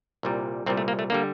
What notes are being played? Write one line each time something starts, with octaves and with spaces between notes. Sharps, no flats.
C2 A#2 G3
C2 A#2 G3 C4
A3
A#3
A3
D3 G3 A#3